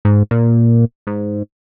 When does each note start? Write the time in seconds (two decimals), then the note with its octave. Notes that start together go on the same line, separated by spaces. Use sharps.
0.05 G#2
0.31 A#2
1.07 G#2